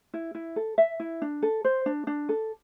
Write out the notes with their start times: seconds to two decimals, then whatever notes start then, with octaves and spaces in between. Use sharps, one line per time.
0.14 E4
0.35 E4
0.56 A4
0.78 E5
1.00 E4
1.22 D4
1.42 A4
1.64 C5
1.86 D4
2.07 D4
2.29 A4